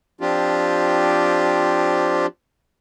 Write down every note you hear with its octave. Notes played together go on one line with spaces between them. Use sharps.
F3 C4 D4 F4 G4